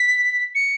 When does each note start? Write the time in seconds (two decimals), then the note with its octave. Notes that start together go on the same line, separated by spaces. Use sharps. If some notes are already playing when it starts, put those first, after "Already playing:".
Already playing: B6
0.55 C#7